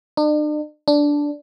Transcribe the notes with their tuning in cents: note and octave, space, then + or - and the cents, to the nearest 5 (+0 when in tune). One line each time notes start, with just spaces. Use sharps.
D4 +45
D4 -5